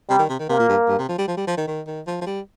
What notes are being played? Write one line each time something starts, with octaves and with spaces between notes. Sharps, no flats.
C3 G3
D#3
C3
D#3
C3 A#3
A#2
G2
G2
C3
F3
G3
F3
G3
F3
D#3
D#3
D#3
F3
F3
G3